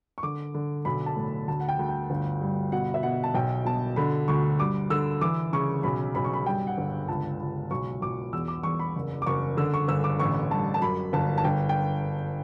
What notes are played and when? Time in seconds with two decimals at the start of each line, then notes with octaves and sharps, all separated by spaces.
0.18 C#6
0.23 D3 D6
0.54 D3
0.85 B1 B5
1.06 A5
1.17 A2
1.48 D2 A5
1.60 F#5
1.69 G5
1.79 D2
1.89 G5
2.10 G1
2.41 G2
2.72 B2 F#5
2.94 E5
3.03 B2 F#5
3.24 A5
3.34 B1 G5
3.65 B2 A5
3.96 D3 B5
4.28 D2 C#6
4.59 G2 D6
4.90 D3 E6
5.21 E3 D6
5.53 C#3 C#6
5.83 B1 B5
6.15 B1 B5
6.24 C#6
6.34 B5
6.46 G2 G5
6.67 F#5
6.78 G1
7.08 C#2 A5
7.40 C#2
7.70 B1 C#6
8.02 B1 D6
8.33 E2 E6
8.48 D6
8.63 E2 C#6
8.79 B5
8.96 F#1
9.22 D6
9.26 F#1 C#6
9.57 D3 E6
9.74 C#6
9.88 G1 E6
10.04 D6
10.20 A1 C#6
10.51 G2 A5
10.74 A5
10.82 F#2 B5
11.13 G1 A5
11.38 A5
11.44 G1 G5
11.69 G5